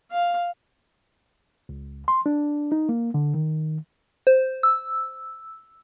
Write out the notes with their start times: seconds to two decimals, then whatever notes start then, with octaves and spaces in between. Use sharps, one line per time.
0.11 F5
1.69 C#2
2.08 C6
2.26 D4
2.72 D#4
2.89 A#3
3.14 D3
3.34 D#3
4.27 C5
4.63 E6